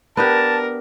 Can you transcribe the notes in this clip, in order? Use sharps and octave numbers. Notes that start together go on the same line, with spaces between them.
B3 D4 G4 A#4 A5